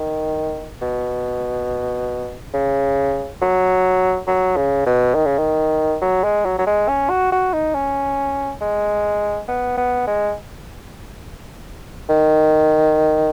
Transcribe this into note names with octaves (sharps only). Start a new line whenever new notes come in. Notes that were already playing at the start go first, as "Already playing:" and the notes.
Already playing: D#3
B2
C#3
F#3
F#3
C#3
B2
D#3
C#3
D#3
F#3
G#3
F#3
F#3
G#3
C#4
F#4
F#4
D#4
C#4
G#3
B3
B3
G#3
D#3